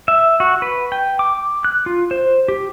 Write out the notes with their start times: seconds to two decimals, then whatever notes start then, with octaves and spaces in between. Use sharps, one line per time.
0.08 E5
0.40 F#4
0.62 B4
0.92 G5
1.19 D6
1.64 F#6
1.86 F4
2.11 C5
2.48 G4